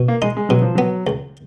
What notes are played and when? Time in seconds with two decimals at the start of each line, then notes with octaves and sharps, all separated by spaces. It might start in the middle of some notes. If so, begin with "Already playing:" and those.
Already playing: B2
0.08 A#3
0.22 G#3 D#4
0.37 G#3
0.49 B2 F#3
0.62 F3
0.75 F#3 B3
1.07 C#2